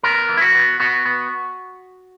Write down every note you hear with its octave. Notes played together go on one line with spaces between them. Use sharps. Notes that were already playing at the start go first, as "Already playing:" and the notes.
B3 A#4
E3
E4
F#4
B3
B3 F#4
B3